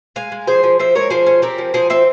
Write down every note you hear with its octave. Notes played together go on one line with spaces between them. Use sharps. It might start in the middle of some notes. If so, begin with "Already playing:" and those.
G#3 F5 G#5
G#3
F3 G#4 C5
F3
F3 C5 E5
G#3 A#4 C#5
F3 G#4 C5
C#4
C4 G4 A#4
F3
F3 G#4 C5
C4 C5 E5